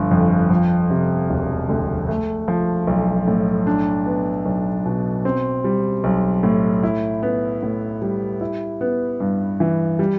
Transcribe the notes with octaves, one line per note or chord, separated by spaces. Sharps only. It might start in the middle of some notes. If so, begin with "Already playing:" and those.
Already playing: G1 D3 F3
F2
F3
C3
E1
D2
A3
F3
B1
A2
D4
B3
B1
B2
C4
G3
B1
A2
E4
B3
A2
G3
E4
B3
G2
E3
G3